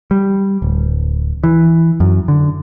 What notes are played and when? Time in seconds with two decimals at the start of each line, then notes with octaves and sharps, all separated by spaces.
0.11 G3
0.62 D1
1.44 E3
2.00 F#2
2.28 D3